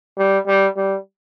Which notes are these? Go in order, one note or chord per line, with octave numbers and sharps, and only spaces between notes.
G3
G3
G3